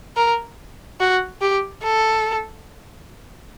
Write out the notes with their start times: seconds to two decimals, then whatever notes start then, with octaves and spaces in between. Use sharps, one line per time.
0.17 A#4
1.00 F#4
1.41 G4
1.83 A4